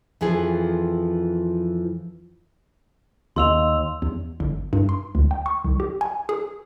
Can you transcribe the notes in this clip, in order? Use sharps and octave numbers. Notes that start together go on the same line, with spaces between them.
F2 E3 F3 G#4
D#2 C6 E6 F7
E2
G1
G2
C6
D2
G5
C#6
C2
G4
G#5
G#4